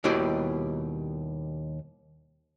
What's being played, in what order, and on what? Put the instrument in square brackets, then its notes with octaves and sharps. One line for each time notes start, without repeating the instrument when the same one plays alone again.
[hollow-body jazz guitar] D#2 B2 G3 E4 D5 D#5